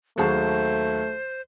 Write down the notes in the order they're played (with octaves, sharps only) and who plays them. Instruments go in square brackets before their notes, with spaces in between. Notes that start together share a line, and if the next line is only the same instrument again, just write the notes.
[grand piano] D#2 F#3 [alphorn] A3 [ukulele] F#4 G#4 A5 [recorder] C5